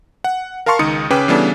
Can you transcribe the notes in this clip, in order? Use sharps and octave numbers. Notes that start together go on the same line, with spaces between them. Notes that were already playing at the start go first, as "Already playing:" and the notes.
F#5
A#4 F5 A5 C6 C#6 F6
C#2 D#3 D#4 D#6 C#7
C#3 C#4 B4 G5 D6
C#3 E3 G3 B3 D4 A4